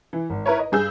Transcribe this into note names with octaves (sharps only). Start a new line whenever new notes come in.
E3
G#1
E4 A#4 B4 C#5
D#5
G2 G#4 E6 G6